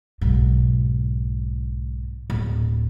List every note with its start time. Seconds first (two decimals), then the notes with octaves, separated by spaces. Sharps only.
0.21 B1 G#2
2.30 D1